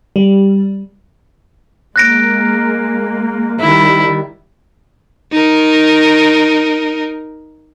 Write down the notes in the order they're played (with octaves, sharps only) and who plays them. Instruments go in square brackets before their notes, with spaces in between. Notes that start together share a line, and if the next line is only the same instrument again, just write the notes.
[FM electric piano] G3
[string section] G#3 A#3 [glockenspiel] F#6 A#6 D7
[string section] D#3 G3 [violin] E4
[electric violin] D#4 A#4